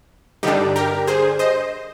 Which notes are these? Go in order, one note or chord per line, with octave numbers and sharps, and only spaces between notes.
G2 D3 G3 D4 D#4 G4
G4 A#4
G#4 C5
C5 D#5